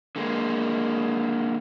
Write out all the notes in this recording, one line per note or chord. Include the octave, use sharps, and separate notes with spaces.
D3 G#3 A#3